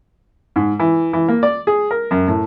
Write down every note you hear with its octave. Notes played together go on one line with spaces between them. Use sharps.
G#2
E3
E3
A#3
D5
G#4
A#4
F#2
A2